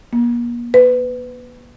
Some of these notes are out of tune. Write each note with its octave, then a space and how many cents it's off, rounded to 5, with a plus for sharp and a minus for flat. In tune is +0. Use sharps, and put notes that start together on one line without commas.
A#3 +40
B4 +20